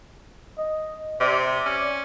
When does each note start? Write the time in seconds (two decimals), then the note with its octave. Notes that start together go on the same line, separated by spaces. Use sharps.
0.58 D#5
1.21 C3 D5
1.66 C#4